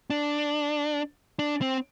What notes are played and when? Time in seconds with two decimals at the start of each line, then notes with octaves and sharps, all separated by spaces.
0.10 D4
1.39 D4
1.61 C4